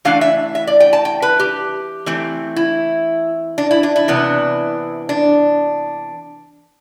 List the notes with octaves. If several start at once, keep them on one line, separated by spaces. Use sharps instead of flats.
E3 A3 D4 F5
E5
E5
D5
G5
A5
G5
B4
G4
E3 A3 C4
E4
D4
E4
D4
E4
C3 E3 B3 D4
D4